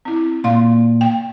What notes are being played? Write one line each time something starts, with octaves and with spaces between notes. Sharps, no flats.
C4 E4
A#2 F5 C6
G5